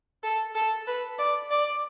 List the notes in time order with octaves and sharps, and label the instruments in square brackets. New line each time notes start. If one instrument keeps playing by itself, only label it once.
[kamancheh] A4
A4
B4
D5
D5